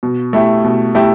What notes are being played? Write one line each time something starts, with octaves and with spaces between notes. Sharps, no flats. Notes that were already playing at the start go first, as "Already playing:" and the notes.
B2
A3 E4 G4
B2
A3 E4 G4